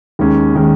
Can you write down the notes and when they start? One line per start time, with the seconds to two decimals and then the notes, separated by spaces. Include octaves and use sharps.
0.19 D#2 D#3 G#3 C#4
0.55 D#3 G#3 C#4